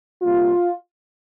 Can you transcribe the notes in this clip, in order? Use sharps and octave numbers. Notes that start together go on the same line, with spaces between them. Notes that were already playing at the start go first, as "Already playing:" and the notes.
C3 G3 A#3 F4